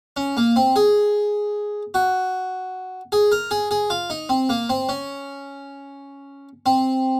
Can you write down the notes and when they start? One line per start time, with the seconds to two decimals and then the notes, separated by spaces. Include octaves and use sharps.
0.16 C#4
0.37 A#3
0.56 C4
0.76 G#4
1.94 F#4
3.12 G#4
3.32 A#4
3.51 G#4
3.71 G#4
3.90 F4
4.10 D#4
4.29 C4
4.49 A#3
4.69 C4
4.89 C#4
6.66 C4